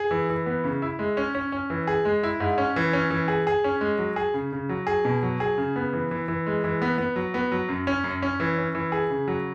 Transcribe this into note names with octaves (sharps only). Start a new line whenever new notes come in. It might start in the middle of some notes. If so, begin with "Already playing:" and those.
Already playing: G#4
E3
E3
B3
C#3
E4
G#3
C#4
C#4
C#4
E3
G#4
G#3
E4
G#2
C#4
E3
C#4
E3
G#4
G#4
C#4
G#3
F#3
G#4
C#3
C#3
F#3
G#4
B2
F#3
G#4
C#3
B3
E3
E3
E3
G#3
E3
B3
B3
F#3
B3
F#3
F#2
C#4
F#2
C#4
E3
C#4
E3
G#4
C#3
F#3